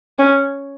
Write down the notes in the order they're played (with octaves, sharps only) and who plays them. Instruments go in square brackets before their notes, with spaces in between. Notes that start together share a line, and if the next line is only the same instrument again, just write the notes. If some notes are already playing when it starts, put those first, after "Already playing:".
[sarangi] C#4